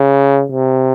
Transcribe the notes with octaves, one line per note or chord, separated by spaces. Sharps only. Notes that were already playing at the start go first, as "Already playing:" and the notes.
Already playing: C#3
C3